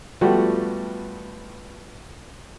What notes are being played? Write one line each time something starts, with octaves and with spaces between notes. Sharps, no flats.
F3 G3 A3 B3 F#4 B4